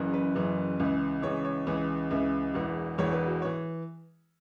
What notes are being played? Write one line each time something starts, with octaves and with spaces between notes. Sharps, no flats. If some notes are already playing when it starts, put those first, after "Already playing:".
Already playing: F#1 F#2 C#3 E3
B4
F#1 F#2 C#3 E3
C#2 C#3 E3
C#2 C#3 E3 C#5
C#5
C#2 C#3 E3
C#2 C#3 E3 E5
E1 E2 E3
E1 E2 E3 C#5
B4
F#4
C#5
E3